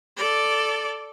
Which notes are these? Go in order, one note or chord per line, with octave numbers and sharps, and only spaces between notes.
A4 D5